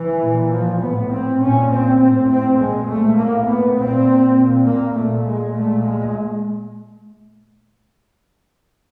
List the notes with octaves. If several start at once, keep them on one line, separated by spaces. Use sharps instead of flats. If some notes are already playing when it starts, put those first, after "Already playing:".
Already playing: E3
A#2
F3
A2 B3
C4
A#2 C#4
C4
A2 C4
C4
A#2 G#3
A3
A2 A#3
B3
A#2 C4
A#2
A#3
A#2 A3
G#3
A#2 A3
G#3